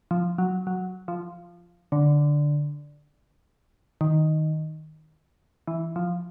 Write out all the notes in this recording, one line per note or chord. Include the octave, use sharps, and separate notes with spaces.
F3
F#3
F#3
F3
D3
D#3
E3
F3